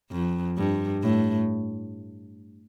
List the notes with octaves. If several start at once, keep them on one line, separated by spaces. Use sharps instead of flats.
F2
G2
A2